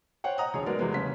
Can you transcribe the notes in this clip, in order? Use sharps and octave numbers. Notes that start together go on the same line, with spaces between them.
C5 C#5 F#5 G5
D#5 F#5 A#5 D#6
E1 A1 D2 G#4 C#5
F#3 G#3 B3 D#4 A#4 D5
E2 C3 F#3 G#3 B3
F#1 C#4 B6